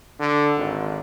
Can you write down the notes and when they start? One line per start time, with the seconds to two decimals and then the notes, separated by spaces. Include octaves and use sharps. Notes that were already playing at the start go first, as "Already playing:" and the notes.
0.20 D3
0.57 G#1